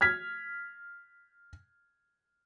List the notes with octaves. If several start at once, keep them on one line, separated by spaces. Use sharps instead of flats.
F6 G#6 B6